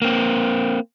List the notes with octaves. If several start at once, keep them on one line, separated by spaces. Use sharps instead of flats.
A#3 C4